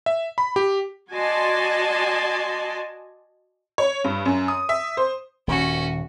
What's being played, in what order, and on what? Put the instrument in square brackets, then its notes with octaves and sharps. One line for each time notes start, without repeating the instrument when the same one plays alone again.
[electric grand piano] E5
B5
G4
[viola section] F#4 D5 D#5 G#5 A5 C6
[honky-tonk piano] C#5
G2
F#2
D#6
E5
C5
[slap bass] D#1 D#2 [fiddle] C#4 F#4